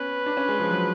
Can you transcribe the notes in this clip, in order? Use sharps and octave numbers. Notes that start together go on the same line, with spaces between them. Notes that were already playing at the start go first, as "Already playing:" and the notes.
Already playing: B3 C#4 B4
D4
C#4
G#3
F3
F#3